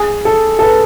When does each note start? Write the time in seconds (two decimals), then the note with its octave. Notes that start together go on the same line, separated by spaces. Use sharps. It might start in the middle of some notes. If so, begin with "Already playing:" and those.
Already playing: G#4
0.25 A4
0.59 A4
0.62 B4